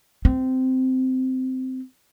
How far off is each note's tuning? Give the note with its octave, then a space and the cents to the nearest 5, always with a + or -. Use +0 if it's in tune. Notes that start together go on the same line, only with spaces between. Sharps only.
C4 -15